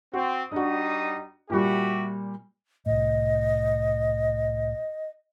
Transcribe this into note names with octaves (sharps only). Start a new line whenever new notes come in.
C4 F#4
G3 D4 D#4 F#4 D#6
A#2 G3 F#4 G4 E5
C2 A2 D#5